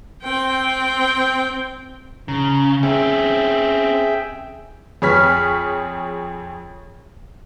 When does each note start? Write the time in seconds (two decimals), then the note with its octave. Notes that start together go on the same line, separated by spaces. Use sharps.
0.23 C4 G5
2.28 C#3 A#5
2.83 C4 C#4 G#4 E5 G5
5.02 F2 G#4 C#5 F6 B6